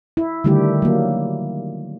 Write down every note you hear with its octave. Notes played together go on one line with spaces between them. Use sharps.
E4
D3 D#3 G3 A3 E4 G4
F#3 A#3